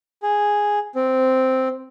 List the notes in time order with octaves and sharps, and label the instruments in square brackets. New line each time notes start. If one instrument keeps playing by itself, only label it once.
[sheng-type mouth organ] G#4
C4